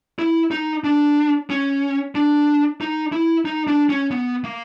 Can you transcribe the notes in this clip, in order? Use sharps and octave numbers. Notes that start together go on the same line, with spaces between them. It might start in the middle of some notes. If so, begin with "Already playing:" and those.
E4
D#4
D4
C#4
D4
D#4
E4
D#4
D4
C#4
B3
A#3